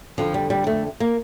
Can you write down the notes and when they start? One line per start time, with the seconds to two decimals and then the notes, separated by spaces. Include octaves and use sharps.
0.18 F2 D3 F3
0.34 G3
0.50 G3
0.67 A3
1.00 A#3